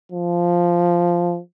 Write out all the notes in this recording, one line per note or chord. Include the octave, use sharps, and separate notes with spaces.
F3